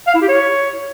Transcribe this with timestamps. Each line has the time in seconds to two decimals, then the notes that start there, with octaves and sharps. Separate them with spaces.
0.08 F5
0.15 E4
0.22 G4
0.29 C#5